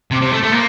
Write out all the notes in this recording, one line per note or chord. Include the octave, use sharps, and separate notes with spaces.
C3
C3
A3
A3
A#3